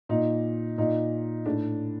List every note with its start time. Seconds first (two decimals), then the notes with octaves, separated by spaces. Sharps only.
0.09 A#2 D#4
0.78 A#2 D#4
1.45 A2 D4